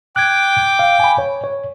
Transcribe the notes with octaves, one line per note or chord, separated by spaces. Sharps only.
G5 D6 F#6 G#6
F5
G#5 B5
C#5
C#5